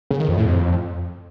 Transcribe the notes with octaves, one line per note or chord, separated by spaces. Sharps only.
C#3
D#3
F2
A2
F2